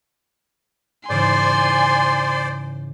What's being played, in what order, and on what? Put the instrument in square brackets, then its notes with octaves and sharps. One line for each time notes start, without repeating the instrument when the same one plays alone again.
[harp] G#2 C#3 E3 [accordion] C5 D5 [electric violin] G#5 C6